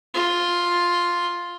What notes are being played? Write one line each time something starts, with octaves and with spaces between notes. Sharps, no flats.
F4